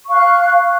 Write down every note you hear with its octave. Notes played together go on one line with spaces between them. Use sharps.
F5 C#6 F#6